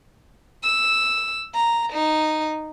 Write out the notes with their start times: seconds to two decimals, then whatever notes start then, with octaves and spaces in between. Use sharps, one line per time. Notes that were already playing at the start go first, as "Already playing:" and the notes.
0.64 E6
1.55 A#5
1.93 D#4